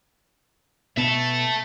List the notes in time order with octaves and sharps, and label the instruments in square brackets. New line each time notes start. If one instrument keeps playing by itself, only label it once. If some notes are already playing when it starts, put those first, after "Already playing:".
[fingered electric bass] B2 B3 [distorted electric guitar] E5 A5